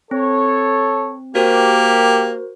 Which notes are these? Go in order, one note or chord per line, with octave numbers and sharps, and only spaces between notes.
C4 A4 C#5
A#3 F#4 G4 A#4 C5